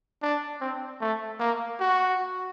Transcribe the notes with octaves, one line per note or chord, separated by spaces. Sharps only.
D4
C4
A3
A#3
F#4